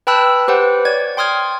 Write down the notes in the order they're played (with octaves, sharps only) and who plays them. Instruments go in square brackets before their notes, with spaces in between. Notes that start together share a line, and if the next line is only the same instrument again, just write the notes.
[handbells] B4 G5 A5 B5 E6 F#6
G4 B4 C5 F#5 G5
C#5 D5 G#6
G5 C6 D#6 F6 G#6